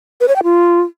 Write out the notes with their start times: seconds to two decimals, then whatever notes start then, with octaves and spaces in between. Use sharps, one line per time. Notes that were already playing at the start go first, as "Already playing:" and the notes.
0.21 B4
0.28 C#5
0.36 G5
0.43 F4